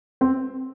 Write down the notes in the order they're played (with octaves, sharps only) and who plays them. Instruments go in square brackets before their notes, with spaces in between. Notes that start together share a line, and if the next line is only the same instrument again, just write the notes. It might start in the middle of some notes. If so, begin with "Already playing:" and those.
[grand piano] C4